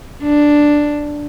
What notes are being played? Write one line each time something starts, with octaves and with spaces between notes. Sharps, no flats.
D4